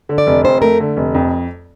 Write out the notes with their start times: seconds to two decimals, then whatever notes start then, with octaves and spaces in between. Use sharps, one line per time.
0.09 D3
0.18 D5
0.27 F1
0.44 F2 C5
0.62 A3 A#4
0.80 D3
0.97 F1
1.15 F2